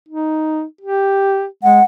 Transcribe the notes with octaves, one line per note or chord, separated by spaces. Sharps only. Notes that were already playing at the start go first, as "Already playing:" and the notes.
D#4
G4
G#3 F#5